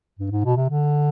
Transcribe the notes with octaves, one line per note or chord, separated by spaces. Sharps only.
G2
G#2
B2
C3
D3